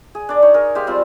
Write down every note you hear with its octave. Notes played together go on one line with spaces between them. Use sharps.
G#4
D4 D5
D#4 C#5
G#4 A#4
G#3 G4 C5 F5
G3 C4 F4